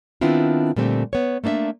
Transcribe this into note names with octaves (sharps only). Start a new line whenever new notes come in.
D#3 B3 C4 D4 E4 F4
A#2 D3 G3 A3 C4
B3 C#5
A3 A#3 D4 D#5 E5